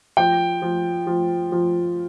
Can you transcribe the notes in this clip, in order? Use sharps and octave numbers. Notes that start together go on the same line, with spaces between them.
F3 G5
F3
F3
F3